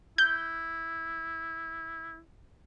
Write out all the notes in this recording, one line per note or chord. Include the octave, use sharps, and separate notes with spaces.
E4 G6